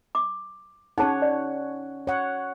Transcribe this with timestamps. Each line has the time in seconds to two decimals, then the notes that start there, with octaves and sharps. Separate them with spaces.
0.15 D6
0.98 C#4 D#4 G#4 C#5 F#5 A5
1.22 D5
2.07 C#5 F#5